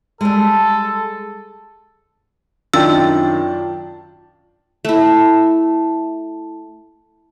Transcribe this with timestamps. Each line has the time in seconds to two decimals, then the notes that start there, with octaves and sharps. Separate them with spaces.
0.21 G3 G#3 A4
2.74 F#2 D#3 D4 F4 G5 E6 A6
4.85 A3 E4